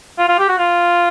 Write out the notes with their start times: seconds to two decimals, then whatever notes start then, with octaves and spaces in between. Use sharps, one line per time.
0.18 F4
0.29 F4
0.39 G4
0.49 F#4
0.58 F4